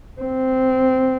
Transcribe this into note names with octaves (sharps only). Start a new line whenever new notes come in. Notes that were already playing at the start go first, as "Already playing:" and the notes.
C4